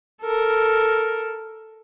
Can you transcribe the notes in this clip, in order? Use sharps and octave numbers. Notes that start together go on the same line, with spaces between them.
A4 A#4